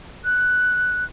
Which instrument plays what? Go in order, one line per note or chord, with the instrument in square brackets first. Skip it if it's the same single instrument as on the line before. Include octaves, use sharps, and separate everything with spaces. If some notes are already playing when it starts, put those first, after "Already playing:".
[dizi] F#6